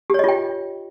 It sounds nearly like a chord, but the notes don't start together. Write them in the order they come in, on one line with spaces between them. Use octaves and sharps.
G4 C#5 D#5 F4 G5